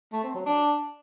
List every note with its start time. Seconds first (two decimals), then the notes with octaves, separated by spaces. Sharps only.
0.13 A3
0.24 C4
0.35 F#3
0.46 D4